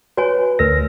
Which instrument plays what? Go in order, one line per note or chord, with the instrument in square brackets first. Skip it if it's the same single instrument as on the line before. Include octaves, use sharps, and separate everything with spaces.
[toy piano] F#4 C#5 G#5 [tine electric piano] B4
[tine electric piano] D2 A#6 [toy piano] A#4 B4